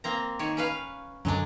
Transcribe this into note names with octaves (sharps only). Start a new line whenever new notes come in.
A#3 C4 A#5
D#3 C#5
C#4 B4 F5
F#2 D3 F#3 G#3 D4